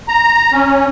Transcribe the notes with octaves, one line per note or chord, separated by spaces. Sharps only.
A#5
C#4